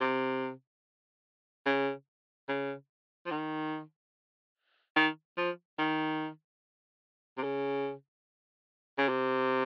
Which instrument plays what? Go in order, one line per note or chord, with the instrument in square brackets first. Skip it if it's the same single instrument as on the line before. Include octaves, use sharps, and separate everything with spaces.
[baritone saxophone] C3
C#3
C#3
F3
D#3
D#3
F3
D#3
C3
C#3
C#3
C3